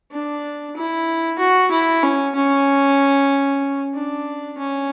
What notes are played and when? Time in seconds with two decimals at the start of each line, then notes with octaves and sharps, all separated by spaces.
0.12 D4
0.76 E4
1.39 F#4
1.72 E4
2.03 C#4
2.35 C#4
3.94 D4
4.58 C#4